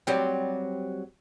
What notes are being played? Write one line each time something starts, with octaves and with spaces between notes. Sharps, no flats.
F#3 G3 C4